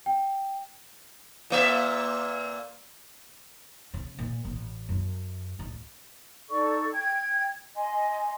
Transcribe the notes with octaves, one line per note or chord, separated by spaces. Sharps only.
G5
A#2 A#3 E5
C#3
A#2
A1
F#2
A1 D2
D#4 A4 D5 C#6
G5 G#6
D#5 G#5 C6